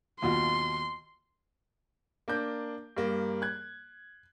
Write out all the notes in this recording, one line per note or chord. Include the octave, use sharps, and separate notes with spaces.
D#2 B2 F4 C6
A#3 D4 G6
G2 A#3
F#6 G#6